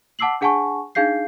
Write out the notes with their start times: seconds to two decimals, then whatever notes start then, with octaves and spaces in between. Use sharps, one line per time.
0.19 F#5 A5 D6 E6 C7 F#7
0.41 D4 G#4 F#5 G#5 A5 C#6
0.95 D4 D#4 G#4 F5 G6 C7